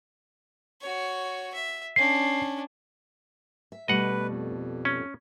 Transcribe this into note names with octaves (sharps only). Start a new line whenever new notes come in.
F#4 C#5
E5
C#4 D4 C7
E5
B2 G3 A3 B4 D#5 F#5
F2
C#4